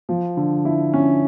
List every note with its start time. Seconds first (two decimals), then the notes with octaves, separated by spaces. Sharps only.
0.09 F3
0.37 D3
0.65 E4
0.94 C#4